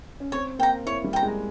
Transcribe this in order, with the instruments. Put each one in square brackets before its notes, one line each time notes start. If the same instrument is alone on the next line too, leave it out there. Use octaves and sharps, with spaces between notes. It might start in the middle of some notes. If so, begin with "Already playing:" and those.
[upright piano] C#4
[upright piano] C4 [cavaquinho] C#5
[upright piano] A#3 [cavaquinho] G5 A#5
[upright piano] E4 [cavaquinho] C#5
[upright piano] G3
[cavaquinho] G5 A#5
[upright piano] G#3